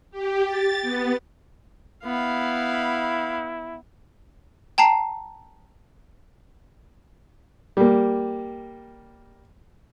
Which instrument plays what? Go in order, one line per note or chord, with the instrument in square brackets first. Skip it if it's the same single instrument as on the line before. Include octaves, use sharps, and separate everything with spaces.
[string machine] G4
A6
B3
[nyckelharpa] B3 F5 [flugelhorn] E4
[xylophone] G5 A5 A#5 C7
[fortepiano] G3 A#3